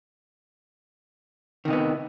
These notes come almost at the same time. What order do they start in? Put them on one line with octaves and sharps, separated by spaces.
D#3 C3 D#4 B3